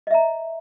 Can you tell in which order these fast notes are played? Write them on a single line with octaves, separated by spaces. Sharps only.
D#5 E5 A#5